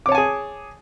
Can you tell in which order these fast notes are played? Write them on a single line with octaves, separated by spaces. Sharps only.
D6 C#5 A5 G#5 G#4